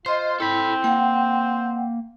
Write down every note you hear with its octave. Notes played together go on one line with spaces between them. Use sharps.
F4 C5 D#5 C6
C4 E4 A4 B5
A#3 F#5 G5